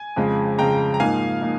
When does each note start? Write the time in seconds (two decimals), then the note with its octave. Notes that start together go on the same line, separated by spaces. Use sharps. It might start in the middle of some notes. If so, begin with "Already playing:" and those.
Already playing: G#5
0.16 F2 C#3 G#3
0.58 F2 C#3 G#3 G5 A#5
0.94 A#5
1.00 G#2 F3 A#3 D#4 F5 G#5
1.41 F3 A#3 D#4